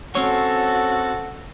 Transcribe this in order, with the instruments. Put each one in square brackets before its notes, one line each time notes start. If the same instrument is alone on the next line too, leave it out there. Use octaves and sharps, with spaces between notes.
[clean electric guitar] C4 C#4 C#5 [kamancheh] F#4 A4